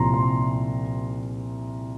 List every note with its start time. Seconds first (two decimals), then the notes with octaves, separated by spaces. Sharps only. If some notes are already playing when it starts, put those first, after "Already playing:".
Already playing: C2 A#2 F3 A#5 C6
0.14 C6